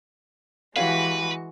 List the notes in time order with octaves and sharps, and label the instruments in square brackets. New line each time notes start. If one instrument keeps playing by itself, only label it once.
[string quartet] E3 G#3 F#4 [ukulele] G4 C#5 F5 [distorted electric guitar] B4